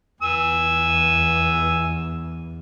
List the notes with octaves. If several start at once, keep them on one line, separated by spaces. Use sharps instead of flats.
E2 G#5 E6